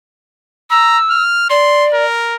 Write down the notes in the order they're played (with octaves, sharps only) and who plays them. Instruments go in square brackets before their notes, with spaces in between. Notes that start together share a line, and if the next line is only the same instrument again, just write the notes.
[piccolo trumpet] A#5 [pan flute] E6
[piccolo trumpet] F6
[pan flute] D5 [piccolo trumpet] C6
[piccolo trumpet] A#4